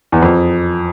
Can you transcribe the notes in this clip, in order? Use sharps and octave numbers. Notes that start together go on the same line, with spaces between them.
E2
F2